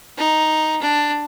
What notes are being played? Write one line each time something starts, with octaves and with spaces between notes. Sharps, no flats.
D#4
D4